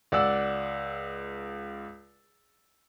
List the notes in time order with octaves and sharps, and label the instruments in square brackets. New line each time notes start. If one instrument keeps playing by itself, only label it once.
[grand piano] C#2 D5 F#5 E6